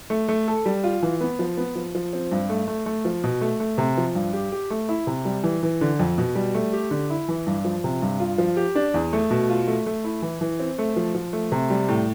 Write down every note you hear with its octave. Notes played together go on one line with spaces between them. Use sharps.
A3
A3
A4
G3
F4
E3
B3
F3
B3
F3
F3
C4
G2
A3
A3
A3
F3
B2
A3
A3
C3
F3
G2
G4
G4
A3
E4
C3
G3
E3
E3
D3
F2
B2
G3
A3
G4
D3
E4
E3
G2
F3
C3
G2
F4
F3
G4
D4
E2
A3
B2
F4
A3
A3
E4
E3
E3
C4
A3
F3
F3
A3
C3
G3
A2